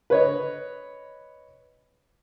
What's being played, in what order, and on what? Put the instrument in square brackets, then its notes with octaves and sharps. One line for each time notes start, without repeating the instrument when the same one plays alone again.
[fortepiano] B4 C#5 D#5